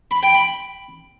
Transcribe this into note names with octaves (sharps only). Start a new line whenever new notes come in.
B5
G5
B5